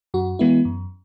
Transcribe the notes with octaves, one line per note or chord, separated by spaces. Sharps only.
F#2 F#4
E3 G#3 B3 E4
F#2